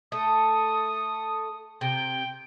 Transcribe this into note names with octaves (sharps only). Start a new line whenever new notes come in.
A3 D#6
C3 G5